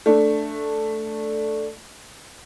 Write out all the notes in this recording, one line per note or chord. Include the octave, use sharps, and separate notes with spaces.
A3 D4